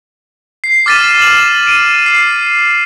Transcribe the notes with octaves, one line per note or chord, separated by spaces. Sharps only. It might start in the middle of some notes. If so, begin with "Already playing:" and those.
C7
D6 F6 A6 B6 D#7 E7
E7 F#7
D7 D#7
C7